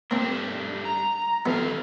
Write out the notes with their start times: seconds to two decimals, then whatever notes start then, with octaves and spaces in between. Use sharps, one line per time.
0.11 G2 A3 A#3 C4 D4
0.85 A#5
1.46 F2 D#3 B3 A4 F5